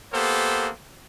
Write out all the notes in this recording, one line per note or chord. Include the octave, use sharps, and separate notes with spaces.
A#3 B3 G4 A4 C5